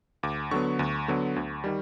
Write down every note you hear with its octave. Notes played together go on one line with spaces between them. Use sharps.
D2 D6
D3 F#3 B3 C#6
D2
D3 F#3 B3
D2
D#3 G3